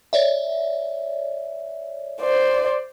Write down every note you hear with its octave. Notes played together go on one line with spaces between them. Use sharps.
C#5 D5 E5
C5 D5